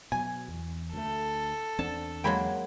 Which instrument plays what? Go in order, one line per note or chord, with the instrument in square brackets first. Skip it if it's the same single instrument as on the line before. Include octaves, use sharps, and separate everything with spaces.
[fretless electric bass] B2 F#3 [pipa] G#5
[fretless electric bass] E2
[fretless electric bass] D2 A3 [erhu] A4
[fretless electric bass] E2 C4 D4 [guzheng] A5
[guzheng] F#3 G#3 A#3 [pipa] G5 B5